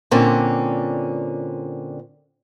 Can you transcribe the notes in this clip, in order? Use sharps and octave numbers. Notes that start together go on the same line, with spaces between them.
A#2 D3 C4 C#4